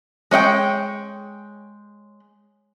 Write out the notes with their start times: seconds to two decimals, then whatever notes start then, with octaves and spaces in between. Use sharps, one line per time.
0.31 G#3 C#5 D#5 G5